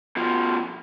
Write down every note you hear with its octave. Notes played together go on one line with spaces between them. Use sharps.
B2 F3